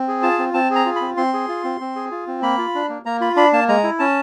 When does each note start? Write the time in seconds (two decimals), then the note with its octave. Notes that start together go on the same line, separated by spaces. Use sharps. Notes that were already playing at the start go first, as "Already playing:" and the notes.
Already playing: C4
0.08 G#4
0.23 F4 A5
0.39 C4
0.54 C4 A5
0.71 G#4 A#5
0.85 F4
0.96 B5
1.01 C4
1.17 C4 C6
1.34 G#4
1.49 F4
1.64 C4
1.80 C4
1.96 G#4
2.11 F4
2.27 C4
2.42 A#3 B5
2.58 F4
2.75 D4
2.89 A#3
3.05 A#3 A#5
3.21 F4 B5
3.36 D4 B5
3.53 A#3 A5
3.68 G#3 A#5
3.84 E4
3.99 C#4 A5